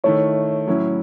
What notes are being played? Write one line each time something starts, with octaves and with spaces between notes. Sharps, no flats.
D#3 A3 E4 C#5
A2 F#3 C#4 E4